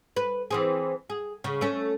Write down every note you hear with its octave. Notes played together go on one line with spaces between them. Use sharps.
B4
E3 C4 G#4
G#4
C#3
A3 C#4